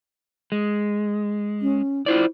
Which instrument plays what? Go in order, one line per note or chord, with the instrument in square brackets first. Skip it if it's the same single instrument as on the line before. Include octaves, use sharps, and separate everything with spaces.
[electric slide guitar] G#3
[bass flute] C#4
[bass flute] E4 [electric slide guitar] F4 C5 D5